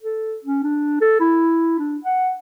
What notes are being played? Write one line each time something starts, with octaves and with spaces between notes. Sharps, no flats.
A4
C#4
D4
A4
E4
D4
F#5